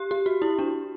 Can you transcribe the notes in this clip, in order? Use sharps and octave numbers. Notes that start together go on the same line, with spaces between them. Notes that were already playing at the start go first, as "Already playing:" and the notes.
Already playing: G4
G4
F#4
E4
D4